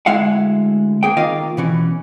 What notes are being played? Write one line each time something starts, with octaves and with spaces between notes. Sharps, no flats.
D2 G#3 E4 F5 F#5
A#3 G#4 G5
D#3 A#3 F4 D#5 F5
B2 E3 C#4